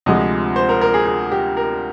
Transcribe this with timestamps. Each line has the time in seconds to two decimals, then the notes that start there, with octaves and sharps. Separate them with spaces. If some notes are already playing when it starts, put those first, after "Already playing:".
0.06 D2 C3 F3 G#3 D#5
0.56 C5
0.69 A#4
0.81 A#4
0.94 G#4
1.06 G#4
1.32 G4
1.57 A#4